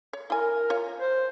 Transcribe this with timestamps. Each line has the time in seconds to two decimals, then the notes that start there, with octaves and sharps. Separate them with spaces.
0.13 C#5
0.30 E4 A#4 G#5
0.70 F4 C#5
0.98 C5